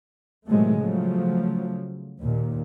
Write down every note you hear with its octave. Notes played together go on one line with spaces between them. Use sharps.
A2 C3 D#3 F#3 G#3 A3
C#3 F3 F#3 A3
D#2 A#2